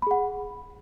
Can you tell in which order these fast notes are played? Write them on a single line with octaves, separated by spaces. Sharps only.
B5 G#4 F#5